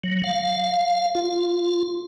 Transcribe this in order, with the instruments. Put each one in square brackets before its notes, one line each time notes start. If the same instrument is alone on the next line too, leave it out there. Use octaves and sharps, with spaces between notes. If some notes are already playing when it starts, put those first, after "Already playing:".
[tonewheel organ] F#3
F5
F4